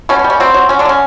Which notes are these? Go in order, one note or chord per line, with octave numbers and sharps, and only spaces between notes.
B2 C#4
C#4
G3
C#4
F#3 C4
F#3
F#3 C#4
D3 D4
F#3 C#4